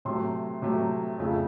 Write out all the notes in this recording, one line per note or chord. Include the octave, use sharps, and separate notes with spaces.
C3 F#3 A3 C6
C3 F#3 A3
F2 C#3 F3 A3